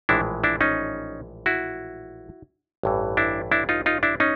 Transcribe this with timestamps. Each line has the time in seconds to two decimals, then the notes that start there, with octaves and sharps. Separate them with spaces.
0.09 A#1 A2 E3 G#3 D4 E4
0.44 D4 E4
0.61 C#4 D#4
1.46 E4 F#4
2.83 A1 G2 E3
3.17 D4 E4
3.52 D4 E4
3.69 D#4 F4
3.86 D#4 F4
4.03 D4 E4
4.20 C#4 D#4